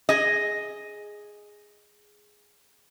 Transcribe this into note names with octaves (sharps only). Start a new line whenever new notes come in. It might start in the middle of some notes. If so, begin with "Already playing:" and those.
G#4 D#5